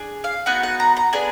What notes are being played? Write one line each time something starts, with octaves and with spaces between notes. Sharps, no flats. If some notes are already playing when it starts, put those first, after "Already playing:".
Already playing: D4 G#4
F5
B3 D#4 F#4 F#5
F#5
A#5
A#5
B3 D4 G#4 G#5